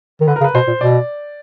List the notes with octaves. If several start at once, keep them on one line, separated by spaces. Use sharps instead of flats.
D#3
D3 B4
A#4
C#3
B4
B2 C5
A#2
B2 D5